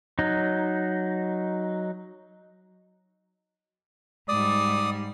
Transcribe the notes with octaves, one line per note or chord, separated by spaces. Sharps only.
F#3 D#4
G#2 G3 D5 D#6